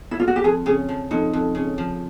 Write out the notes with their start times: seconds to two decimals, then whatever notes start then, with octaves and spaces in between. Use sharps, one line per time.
0.11 E4
0.20 F4
0.28 F#4
0.36 G4
0.44 F2 G#4
0.66 C#3 G#4
0.89 F3
1.11 F2 D#4
1.33 F2
1.55 C#3
1.78 F3